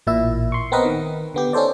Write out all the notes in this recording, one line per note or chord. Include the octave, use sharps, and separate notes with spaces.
A1 A#2 E4 E5
C6 C#6
B3 C4 A#4 B4 D#5
D#3
D3 B3 G4
C#4 D#4 A4 C5 D5